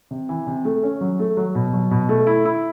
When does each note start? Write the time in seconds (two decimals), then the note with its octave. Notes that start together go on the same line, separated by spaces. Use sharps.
0.11 C3
0.29 E3
0.47 C3
0.65 A3
0.83 C#4
1.01 F#3
1.19 A3
1.37 F#3
1.55 B2
1.73 F#3
1.91 B2
2.09 A3
2.27 E4
2.45 E4